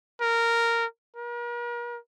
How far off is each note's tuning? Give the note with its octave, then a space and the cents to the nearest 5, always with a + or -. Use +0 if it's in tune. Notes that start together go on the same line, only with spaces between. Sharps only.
A#4 -10
A#4 +40